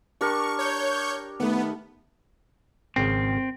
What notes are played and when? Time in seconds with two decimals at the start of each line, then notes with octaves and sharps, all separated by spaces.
0.21 D4 G4 A#4 C#6
0.59 C#5 C#6 G6
1.40 D#3 A3 B3 B4
2.96 G#1 C#3 C4